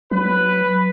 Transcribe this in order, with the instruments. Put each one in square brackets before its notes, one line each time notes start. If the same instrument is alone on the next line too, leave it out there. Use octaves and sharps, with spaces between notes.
[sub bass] F#3 [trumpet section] B4